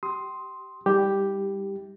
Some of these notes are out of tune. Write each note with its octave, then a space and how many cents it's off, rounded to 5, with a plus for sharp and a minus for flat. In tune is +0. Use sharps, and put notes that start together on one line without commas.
G4 -30 C6 +0 D#6 +20
G3 +20 D#4 +45 G4 +0